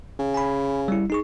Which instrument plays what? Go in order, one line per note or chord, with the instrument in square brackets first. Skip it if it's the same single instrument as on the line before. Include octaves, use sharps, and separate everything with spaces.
[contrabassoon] C#3
[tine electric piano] G#5 B5
G3 E4
D#4 G#4 C#6